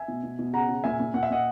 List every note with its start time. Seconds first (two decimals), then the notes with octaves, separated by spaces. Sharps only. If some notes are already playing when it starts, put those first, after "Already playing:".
Already playing: E5 G#5
0.08 B2
0.23 B2
0.39 B2
0.53 C#3 F#5 A#5
0.69 C#3
0.84 A#2 E5 G#5
1.00 A#2
1.14 A#2 F#5
1.23 E5
1.30 A#2 D#5 F#5